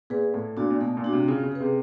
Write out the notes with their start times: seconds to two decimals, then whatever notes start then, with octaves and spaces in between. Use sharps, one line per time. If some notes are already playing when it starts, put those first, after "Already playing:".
0.10 A#2 G#4 B4
0.34 A2 A3
0.57 A#2 D4 F#4
0.70 A#2
0.81 B2 A3
0.97 A#2
1.04 D4 F#4
1.13 C3
1.28 C#3 F4
1.43 C#3
1.52 G#4 B4
1.60 C3